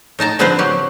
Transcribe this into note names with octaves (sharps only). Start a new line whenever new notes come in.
A2 D#4 A5 A#5
D3 F3 B3 C4 B4 C5
F#3 G4